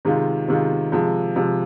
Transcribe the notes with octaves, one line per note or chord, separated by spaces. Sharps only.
C3 D#3 G#3 F4
C3 D#3 G#3 F4
C3 F3 G#3
C3 F3 G#3